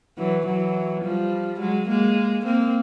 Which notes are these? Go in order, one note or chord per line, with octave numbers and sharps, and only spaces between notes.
E3 F#3
E3 F#3
F3 G3
F#3 G#3
G#3 A#3
A#3 C4